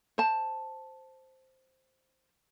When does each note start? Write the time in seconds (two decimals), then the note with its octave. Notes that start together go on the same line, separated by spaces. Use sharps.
0.18 C5 A5